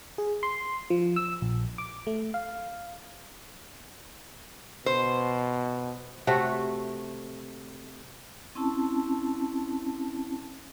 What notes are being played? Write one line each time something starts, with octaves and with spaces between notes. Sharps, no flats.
G#4
C6
F3
E6
A#1
D6
A3
F5
B2 C5
C3 A3 F#4
C4 C#4 E4 A5